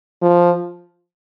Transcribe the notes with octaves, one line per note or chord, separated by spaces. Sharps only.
F3